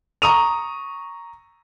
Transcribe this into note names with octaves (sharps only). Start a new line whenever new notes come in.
A#5 C#6 D#6 D#7 F7